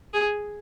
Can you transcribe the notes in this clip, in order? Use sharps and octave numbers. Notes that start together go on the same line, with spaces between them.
G#4